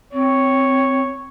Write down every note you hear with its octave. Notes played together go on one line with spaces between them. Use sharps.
C4 C#5